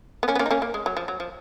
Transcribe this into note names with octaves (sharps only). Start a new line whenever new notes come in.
B3
A#3 C#4
B3
A#3 C#4
D#4
A#3 C#4
A#3
G#3
F#3
F3
F#3
F3